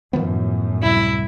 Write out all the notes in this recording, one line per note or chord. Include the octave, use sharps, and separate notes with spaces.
F#2 A2 D#3 F3 B3
D2 C3 G3 E4